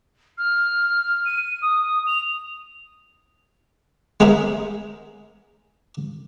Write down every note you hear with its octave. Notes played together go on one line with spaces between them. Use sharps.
F6
D#7
D#6
F7
G#3 B3 G#4 A#4 C5 E5